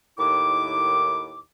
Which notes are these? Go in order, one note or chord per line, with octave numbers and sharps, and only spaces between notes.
D#2 A2 D#3 E4 D6